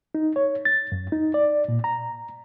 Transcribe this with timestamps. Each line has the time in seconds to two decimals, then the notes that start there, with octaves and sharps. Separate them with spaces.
0.15 D#4
0.36 C#5
0.65 A6
0.92 F#2
1.12 D#4
1.34 D5
1.69 A#2
1.84 A#5